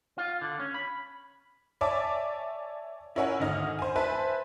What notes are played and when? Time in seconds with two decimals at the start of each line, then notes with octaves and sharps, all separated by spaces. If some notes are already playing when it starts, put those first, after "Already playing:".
0.18 F4
0.41 D3
0.59 C#4
0.74 B5
1.81 C#5 D5 E5 G#5 A5 D6
3.15 C#4 E4 A#4 C#5 F#5 G#5
3.39 G#1 D2 D#5 F6
3.79 C5 G#5
3.96 B4 C5 E5 G#5 A5